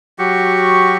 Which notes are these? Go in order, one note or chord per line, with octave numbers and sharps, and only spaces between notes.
F#3 F#4 G4 C#6